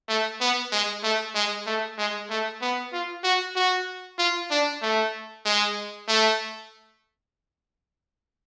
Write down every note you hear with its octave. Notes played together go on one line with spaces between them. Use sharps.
A3
B3
G#3
A3
G#3
A3
G#3
A3
B3
F4
F#4
F#4
F4
D4
A3
G#3
A3